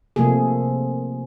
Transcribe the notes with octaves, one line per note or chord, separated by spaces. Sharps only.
C3 F3 A3 A#3 G#4